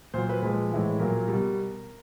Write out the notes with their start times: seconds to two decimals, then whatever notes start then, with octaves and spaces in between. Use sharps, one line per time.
0.14 A#2 F#3 C5
0.29 B4
0.42 A#2 F3 G#3 B4
0.72 A2 E3 G#3
1.00 A#2 F#3 A#4
1.28 B2 G3